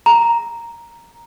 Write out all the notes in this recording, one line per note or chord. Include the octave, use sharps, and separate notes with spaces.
A#5